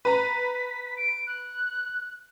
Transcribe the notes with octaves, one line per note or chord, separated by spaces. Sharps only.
B4 A#5 B6
D7
F#6